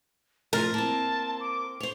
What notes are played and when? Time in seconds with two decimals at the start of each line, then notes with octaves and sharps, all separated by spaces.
0.53 A2 F3 A#4 A6
0.74 A#3 C4 A5
1.40 D6
1.80 C5 C#5 F7